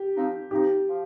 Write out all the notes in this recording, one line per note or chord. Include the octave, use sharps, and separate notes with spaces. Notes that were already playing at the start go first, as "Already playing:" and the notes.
Already playing: G4
F3 C4 D#4
F3 C4 D#4 G4
F3